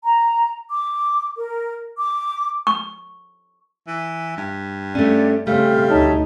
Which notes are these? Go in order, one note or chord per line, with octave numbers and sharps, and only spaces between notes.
A#5
D6
A#4
D6
C#6
E3
G2
A3 C#4 D5
C#3 G3 A3 C4 F5 F6
D2 D#4 C#5 E5 A5